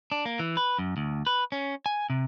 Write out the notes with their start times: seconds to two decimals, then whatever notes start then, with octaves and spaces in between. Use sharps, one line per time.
0.12 D4
0.26 A#3
0.39 E3
0.57 B4
0.79 F#2
0.97 D2
1.27 B4
1.52 C#4
1.86 G#5
2.10 C3